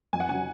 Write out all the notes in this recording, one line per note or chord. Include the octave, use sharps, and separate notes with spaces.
F2 G#5
F#5
C#3 F#3 G#5